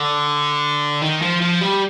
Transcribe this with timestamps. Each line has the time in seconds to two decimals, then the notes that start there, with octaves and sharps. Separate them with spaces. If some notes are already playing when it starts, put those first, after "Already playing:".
Already playing: D3
1.02 D#3
1.22 F3
1.42 F3
1.62 G3